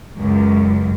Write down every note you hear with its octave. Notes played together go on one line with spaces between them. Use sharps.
C#2 F#2